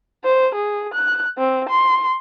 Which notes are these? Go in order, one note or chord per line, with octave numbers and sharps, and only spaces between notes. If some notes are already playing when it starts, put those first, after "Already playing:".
C5
G#4
F#6
C4
C6